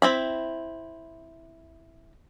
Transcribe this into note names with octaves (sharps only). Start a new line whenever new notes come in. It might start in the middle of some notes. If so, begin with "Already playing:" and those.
C4 E4 B5